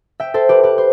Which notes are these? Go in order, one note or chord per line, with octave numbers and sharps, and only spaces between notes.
E5 G5
A4 C5
G4 B4
G4 B4
C5